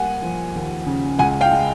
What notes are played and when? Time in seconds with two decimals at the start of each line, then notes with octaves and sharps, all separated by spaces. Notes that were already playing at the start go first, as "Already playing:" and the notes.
Already playing: G3 A#3 F#5 G#5
0.22 F3
0.55 D#2
0.86 C#3
1.19 C#2 F#5 G#5
1.41 F5 G5
1.51 G#3